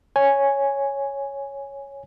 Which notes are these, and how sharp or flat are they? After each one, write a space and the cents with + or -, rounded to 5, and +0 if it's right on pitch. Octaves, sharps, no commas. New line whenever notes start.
C#5 +0 G#5 +0